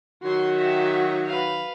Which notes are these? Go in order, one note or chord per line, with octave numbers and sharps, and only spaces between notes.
D#3 F#3 F#4 C6
G4 E5
B4 F5